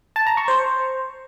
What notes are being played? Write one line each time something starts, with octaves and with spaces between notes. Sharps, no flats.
A5
A#5
C#6
C5